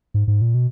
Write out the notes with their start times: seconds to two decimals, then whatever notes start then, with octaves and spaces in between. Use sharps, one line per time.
0.14 G#2
0.28 G#2
0.41 A#2
0.55 B2